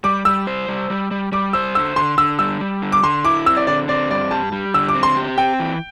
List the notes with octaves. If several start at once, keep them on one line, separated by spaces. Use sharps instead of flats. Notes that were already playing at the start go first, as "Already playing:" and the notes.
G3 D6
G3 E6
C5
G3
G3
G3
G3 D6
C5 E6
D3 E6
D3 C6
D3 E6
G3 E6
G3
D3
D6
D3 C6
E4 D6
C4 E6
D5
D3 D5
C4 D5
G2 D5
G3 A5
G3
D3 E6
D6
C4
C6
G4
C4 G5
E3